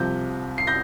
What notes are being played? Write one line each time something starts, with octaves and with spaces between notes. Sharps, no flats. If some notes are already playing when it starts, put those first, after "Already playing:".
Already playing: C2 C3 F3 G6
C7
G6 A#6